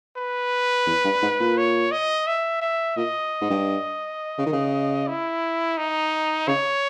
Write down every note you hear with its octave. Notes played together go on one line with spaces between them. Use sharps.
B4
E2
G2
G#2
A#2
C#5
D#5
E5
E5
A#2 D#5
G#2
G2
C#3
D#3
C#3
E4
D#4
C#3 C#5